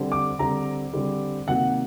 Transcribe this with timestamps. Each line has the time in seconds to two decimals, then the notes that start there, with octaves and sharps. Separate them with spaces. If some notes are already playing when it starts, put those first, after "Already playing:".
Already playing: D3 G3 C4
0.12 D6
0.39 D3 G3 C4 A#5
0.93 D3 G3 C4
1.47 C3 D#3 F#3 A#3 F#5